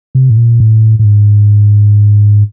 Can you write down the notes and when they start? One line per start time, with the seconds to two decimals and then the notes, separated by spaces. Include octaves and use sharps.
0.15 C3
0.30 A2
0.37 A#2
0.60 A2
0.99 A2
1.04 G#2